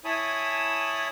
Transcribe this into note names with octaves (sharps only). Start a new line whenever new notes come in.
E4 C#5 G#5 A5 B5 D#6